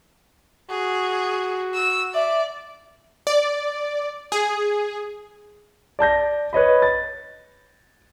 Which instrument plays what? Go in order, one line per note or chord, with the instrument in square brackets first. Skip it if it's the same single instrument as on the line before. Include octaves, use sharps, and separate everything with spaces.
[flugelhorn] F#4 [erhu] G#4
[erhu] E6
[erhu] D5 [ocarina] E5
[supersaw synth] D5
G#4
[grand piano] D5 A5 G6 A#6
B4 C#5 D#5 B5
A6